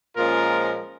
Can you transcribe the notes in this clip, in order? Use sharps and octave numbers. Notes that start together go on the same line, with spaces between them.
A#2 F3 G#3 C#4 F4 A#4